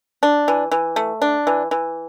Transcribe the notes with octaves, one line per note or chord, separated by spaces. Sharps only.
D4
E3
E3
A3
D4
E3
E3